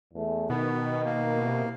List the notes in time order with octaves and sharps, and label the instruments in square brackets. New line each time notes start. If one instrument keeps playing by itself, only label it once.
[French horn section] E2 A3
[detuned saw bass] B2 [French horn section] D#3 [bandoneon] B3
[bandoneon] A#3
[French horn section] C3 E4 A#4